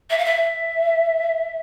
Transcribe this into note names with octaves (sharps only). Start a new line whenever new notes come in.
E5
F5
E5